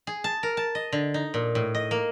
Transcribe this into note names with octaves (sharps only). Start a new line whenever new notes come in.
G#4
A5
A#4
A5
D#5
D3
D#4
A#2
A2
D#5
A#3